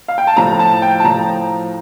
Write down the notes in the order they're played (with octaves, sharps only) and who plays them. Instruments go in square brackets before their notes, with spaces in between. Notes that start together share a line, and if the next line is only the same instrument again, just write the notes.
[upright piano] F5
G5
A5
A2 F3 A#5
A5
G5
A5
A2 F3 A#5